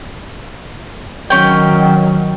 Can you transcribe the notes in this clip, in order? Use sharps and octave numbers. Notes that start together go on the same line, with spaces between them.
D#3 F#3 C#4 G5